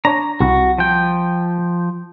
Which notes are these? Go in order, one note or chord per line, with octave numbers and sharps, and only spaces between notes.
D4 C#5 A#5
C2 F#4
F3 G5